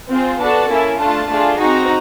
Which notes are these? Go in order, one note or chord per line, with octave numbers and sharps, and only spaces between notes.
C4 F4 G#4
B3 D4 F#4 A4 A5
A#3 C#4 E4
A3 D4 F4 A5
A3 D4 F4 G#4
C4 D#4 F#4 A#5